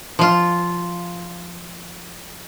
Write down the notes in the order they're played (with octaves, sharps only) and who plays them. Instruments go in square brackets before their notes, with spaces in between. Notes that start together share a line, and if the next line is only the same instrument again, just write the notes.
[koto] F3 F4